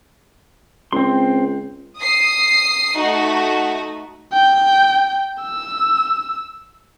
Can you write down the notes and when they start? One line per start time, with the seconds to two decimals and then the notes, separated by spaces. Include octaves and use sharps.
0.93 C#2 C4 C6
1.99 D#6 C7
2.99 A3 D#4 F#4
4.33 G5
5.42 E6